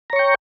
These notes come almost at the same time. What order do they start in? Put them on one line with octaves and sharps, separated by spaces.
A#5 C#5 C#6 G5